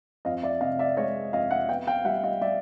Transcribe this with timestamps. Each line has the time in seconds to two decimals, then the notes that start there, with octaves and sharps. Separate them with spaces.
0.25 F2 D#5 F5
0.43 D5 E5
0.61 C3 D#5 F5
0.79 D5 E5
0.97 G#3 C#5 D#5
1.33 F2 D#5 F5
1.51 E5 F#5
1.69 B3 F5 G5
1.87 F5 G5
2.05 G3 E5 F#5
2.23 D#5 F5
2.41 G3 D5 E5